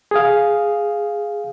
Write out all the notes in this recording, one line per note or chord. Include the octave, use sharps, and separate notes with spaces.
G#4 F5